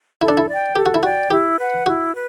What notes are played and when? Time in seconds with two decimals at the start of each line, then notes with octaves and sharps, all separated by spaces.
0.21 E4 A4
0.28 D4
0.37 E4
0.49 D5 G5
0.76 G4 A4
0.86 F#4
0.94 E4
1.03 F#4 D5 G5
1.31 E4 G4
1.59 B4 F#5
1.86 E4 F#4
2.13 B4